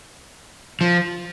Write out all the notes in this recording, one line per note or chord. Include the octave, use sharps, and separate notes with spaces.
F3